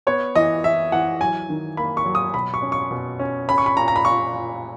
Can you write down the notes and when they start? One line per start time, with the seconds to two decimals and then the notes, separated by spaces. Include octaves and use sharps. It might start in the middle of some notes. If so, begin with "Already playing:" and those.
0.07 B3 C#5
0.35 E3 D#5
0.64 E3 E5
0.92 E3 F#5
1.21 F#3 G#5
1.49 D#3
1.77 A#3 B5
1.97 C#6
2.06 F#3
2.15 D#6
2.34 B2 B5
2.54 C#6
2.62 C#4
2.72 C#6
2.91 B2
3.19 C#4
3.48 C#4 B5
3.58 C#6
3.66 B5
3.77 A#2 A#5
3.88 A#5
3.96 B5
4.05 A#2 C#6
4.34 A#2